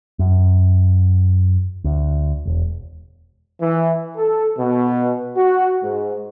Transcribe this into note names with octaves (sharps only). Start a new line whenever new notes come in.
F#2
D2
E1
E3
A4
B2
F#4
G#2